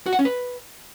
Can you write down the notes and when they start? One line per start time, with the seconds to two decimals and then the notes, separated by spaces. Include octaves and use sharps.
0.06 F#4
0.13 F#5
0.19 C#4
0.25 B4